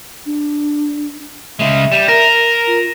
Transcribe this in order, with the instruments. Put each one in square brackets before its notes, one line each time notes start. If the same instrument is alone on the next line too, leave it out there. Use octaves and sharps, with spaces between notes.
[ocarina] D4
[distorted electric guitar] C#3 G#3 [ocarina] E5
[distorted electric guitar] G3 [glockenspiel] D#7 E7
[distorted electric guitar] A#4 [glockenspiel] A#6
[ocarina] F4